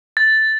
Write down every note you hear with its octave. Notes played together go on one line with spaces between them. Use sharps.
A6